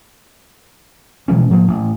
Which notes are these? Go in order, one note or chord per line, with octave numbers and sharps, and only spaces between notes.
B2 E3 G#3 C#4
A2 F3 A#3
A1